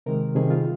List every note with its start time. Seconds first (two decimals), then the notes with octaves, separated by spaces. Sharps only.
0.06 C3 D#3 G#3 A#4
0.35 C3 D#3 G3 G#4
0.50 F4